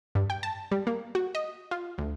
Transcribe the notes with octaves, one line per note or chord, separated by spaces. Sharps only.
G2
G5
A5
G3
A#3
F#4
D#5
F4
D2